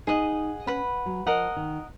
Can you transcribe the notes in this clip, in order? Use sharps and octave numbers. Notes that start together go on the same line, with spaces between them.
D#4 G#4 D#5 F#5
C#4 B4 F#5 B5
F#3
F3 A#4 D#5 F#5
D#3